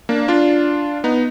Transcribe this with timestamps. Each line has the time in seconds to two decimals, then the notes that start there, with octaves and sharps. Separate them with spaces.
0.09 A#3 D4
0.28 D4 F4
1.04 B3 D#4